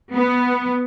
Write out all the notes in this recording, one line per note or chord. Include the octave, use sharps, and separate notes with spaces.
B3